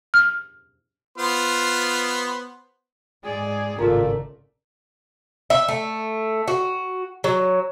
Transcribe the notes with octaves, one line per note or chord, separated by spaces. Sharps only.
F6
B3 F4 C5
G#2 G#3 G#4 D5
G#1 A2 C#3 A3 F4 A#4 D5
E5
A3
F#4
F#3